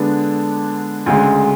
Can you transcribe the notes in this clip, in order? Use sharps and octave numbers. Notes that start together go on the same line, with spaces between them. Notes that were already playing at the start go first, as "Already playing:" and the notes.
Already playing: D3 G#3 B3 D4
D2 C#3 G#3